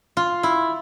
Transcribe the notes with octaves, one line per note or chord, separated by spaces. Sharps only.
F4
E4